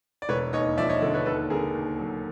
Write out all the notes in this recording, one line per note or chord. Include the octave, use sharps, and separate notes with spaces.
D5
E1 B4 C#5
D#2 C#5 D#5
F3 D5 E5
C#5 D#5
D3
B4 C#5
D#2 A4 B4
D3 G#4 A#4
D#2
F#3